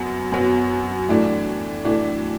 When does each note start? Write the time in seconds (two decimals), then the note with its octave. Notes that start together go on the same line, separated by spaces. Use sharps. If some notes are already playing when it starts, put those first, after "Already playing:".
Already playing: F#2 F#3 B3
0.32 F#2 F#3 B3
1.08 A2 E3 A3 D4
1.85 A2 E3 A3 D4